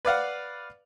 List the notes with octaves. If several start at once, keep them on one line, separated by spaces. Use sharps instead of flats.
B4 D5 F5 F#5